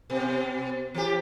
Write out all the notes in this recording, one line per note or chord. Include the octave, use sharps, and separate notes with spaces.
B2
E3 G4